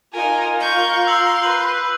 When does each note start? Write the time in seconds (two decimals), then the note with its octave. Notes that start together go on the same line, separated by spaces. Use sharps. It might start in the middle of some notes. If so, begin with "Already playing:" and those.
0.14 D#4 F4 A#4 G#5
0.60 A#4 C#6 G6
1.07 C6 E6 G6 F#7
1.43 B4 F#7